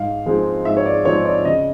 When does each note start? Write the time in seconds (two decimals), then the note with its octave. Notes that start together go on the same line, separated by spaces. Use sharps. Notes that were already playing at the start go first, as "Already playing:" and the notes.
Already playing: G#2 F5
0.26 F3 G#3 C4 D#4
0.65 G#2 E5
0.77 C#5
0.86 D5
1.05 F3 G#3 C4 D#4 C#5
1.25 D5
1.45 C#3 D#5